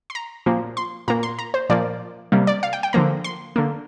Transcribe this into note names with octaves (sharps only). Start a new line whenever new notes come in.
C6
A#5
A#2 F3 A#3
C6
A#2 A#3 A#5
C6
A#5
C5
A#2 F3 A#3 D5
C3 G3 A#3
D5
F5
G5
G5
D3 F3 A#3 A#5
C6
D3 A#3